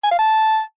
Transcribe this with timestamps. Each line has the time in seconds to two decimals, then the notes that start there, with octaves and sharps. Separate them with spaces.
0.04 G#5
0.11 F5
0.19 A5